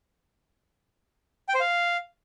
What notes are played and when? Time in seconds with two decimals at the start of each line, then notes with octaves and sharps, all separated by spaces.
1.49 G5
1.55 C5
1.60 F5